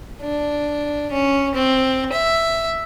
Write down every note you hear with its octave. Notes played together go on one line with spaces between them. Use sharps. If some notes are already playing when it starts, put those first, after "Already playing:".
D4
C#4
C4
E5